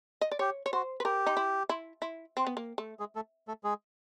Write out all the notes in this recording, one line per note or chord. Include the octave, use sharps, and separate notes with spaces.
D#5
D5
G4 C#5
C#5
F#4 C5
B4
G4 A#4
D#4
E4
E4
E4
C4
B3
A#3
A3
G#3 G#4
A3 A4
A3 A4
G#3 G#4